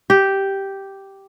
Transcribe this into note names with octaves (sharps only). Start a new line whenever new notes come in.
G4